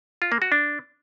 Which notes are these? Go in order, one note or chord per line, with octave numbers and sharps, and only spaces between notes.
F4
A#3
F#4
D4